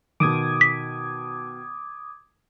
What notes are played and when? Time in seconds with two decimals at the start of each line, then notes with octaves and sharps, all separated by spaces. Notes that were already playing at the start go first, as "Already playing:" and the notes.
0.20 B2 D#3 D6 D#6 G#6
0.61 B6